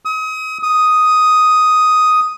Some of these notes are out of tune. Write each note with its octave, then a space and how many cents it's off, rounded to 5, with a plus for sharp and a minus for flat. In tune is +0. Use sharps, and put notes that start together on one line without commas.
D#6 +35
D#6 +5